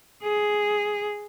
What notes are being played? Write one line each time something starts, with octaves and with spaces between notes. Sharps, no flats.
G#4